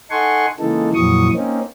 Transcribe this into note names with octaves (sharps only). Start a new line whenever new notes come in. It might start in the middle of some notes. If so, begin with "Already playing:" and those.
D#4 A4 F#5 G#5 C6 C#6
C#3 E3 G#3 A#3 D#4 A4
F2 A#2 E3 F#3 C#6 D#6
A#3 C4 C#4 D#4